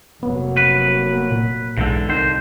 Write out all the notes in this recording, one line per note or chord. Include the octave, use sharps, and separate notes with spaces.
F1 F#3 A#3 B3
B4
A#2
B1 E2 G#2 D3
C2 F2 D#3 C5